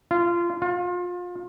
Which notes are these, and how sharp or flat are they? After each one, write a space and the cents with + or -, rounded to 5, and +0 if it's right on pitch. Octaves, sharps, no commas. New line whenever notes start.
F4 -20
F4 +30